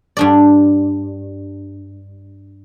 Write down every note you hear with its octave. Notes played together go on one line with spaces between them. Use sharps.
G2 D4 D5